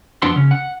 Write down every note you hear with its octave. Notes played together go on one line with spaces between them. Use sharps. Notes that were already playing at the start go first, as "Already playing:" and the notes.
F2 B3 C4 D4 F#4 C6
C#3 C#4
F#5